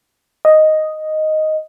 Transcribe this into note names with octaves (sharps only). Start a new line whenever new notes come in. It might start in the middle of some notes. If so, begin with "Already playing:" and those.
D#5